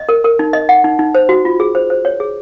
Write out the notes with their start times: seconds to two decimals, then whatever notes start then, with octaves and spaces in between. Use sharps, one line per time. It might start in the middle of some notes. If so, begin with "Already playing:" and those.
Already playing: D#5
0.09 A#4
0.24 A#4
0.39 D#4
0.53 D#5
0.69 F#5
0.84 D#4
0.99 D#4
1.15 C5
1.29 F#4
1.45 F4
1.60 G#4
1.75 C5
1.90 C5
2.05 C#5
2.20 G#4